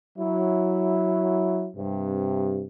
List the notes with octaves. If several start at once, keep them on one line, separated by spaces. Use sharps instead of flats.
F#3 E4
G2 C3